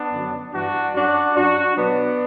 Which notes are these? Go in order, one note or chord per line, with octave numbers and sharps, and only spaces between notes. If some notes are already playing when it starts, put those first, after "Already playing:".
Already playing: B3 D4
F#2 D3 F#3
G2 E3 G3 D4 F#4
F#2 F#3 D4 F#4
F#2 F#3 D4 F#4
B2 F#3 B3 D4